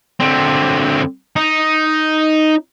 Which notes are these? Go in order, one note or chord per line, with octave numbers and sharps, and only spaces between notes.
D3 C4
D#4